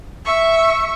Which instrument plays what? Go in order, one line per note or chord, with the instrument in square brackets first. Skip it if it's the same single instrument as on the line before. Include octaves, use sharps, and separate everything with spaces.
[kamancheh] E5 C#6